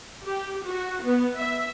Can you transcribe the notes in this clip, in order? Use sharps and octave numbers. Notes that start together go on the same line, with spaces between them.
G4
F#4
B3
E5